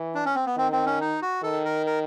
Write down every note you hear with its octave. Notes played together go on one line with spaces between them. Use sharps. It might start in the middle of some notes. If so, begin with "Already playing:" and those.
Already playing: E3
D4
C#4
C4
B3
D#3 C4
C4
C#4
D#4
F#4
D#3 A4
A#4
A#4